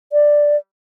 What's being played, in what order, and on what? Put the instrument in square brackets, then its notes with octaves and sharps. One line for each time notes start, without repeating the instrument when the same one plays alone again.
[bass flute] D5